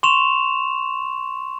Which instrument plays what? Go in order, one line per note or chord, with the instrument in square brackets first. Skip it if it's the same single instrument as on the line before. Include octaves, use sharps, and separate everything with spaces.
[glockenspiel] C6 C#6 E7 F7